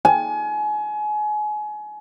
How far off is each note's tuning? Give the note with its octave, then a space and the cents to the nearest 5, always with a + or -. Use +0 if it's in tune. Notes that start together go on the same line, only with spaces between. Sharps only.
G#5 +30